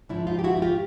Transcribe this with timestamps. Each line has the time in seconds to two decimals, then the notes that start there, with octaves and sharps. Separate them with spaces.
0.09 G#2 F3 D4 E4
0.27 D#4 F4
0.39 G4
0.44 E4 F#4
0.57 F#4
0.62 F4 G4